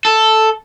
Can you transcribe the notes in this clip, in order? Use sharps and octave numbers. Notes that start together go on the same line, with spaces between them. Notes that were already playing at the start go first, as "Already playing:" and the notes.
A4